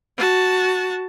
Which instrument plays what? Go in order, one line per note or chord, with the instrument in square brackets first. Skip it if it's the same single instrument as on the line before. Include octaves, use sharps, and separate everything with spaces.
[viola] F#4 A5